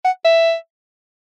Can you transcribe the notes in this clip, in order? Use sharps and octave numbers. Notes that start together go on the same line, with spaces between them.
F#5
E5